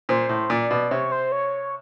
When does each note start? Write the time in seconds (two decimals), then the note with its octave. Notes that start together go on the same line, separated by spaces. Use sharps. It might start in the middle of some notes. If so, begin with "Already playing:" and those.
0.09 A#2 C5
0.29 A2
0.50 A#2 D5
0.71 B2
0.91 C3 C#5
1.12 C5
1.32 C#5